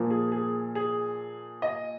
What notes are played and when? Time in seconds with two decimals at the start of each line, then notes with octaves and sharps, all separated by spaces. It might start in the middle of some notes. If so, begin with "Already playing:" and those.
Already playing: A#2 F3 A#3
0.10 G#4
0.32 G#4
0.75 G#4
1.62 D#5